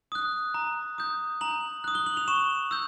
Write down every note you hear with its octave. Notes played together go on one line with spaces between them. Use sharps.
D#6 F#6
A#5
D#6 G6
A#5 F#7
D#6 F#6
G7
F#7
F7
C#6 E7
E6 G6